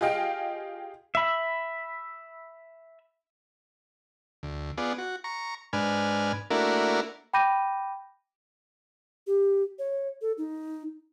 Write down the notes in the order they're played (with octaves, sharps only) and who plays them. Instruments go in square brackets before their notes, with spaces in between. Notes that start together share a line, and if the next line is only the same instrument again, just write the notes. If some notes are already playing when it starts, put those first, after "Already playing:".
[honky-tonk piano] F4 G4 G#4 D#5 F5 G5
[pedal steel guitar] E5 B5
[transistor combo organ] D2
B3 F4 G#4 D5
F#4
A#5 C#6
G#2 D4 B4 G#5 F6
A3 A#3 D4 E4 F#4 A#4
[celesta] G5 B5 D6 G6 A#6 D#7
[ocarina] G4
C#5
A4
D#4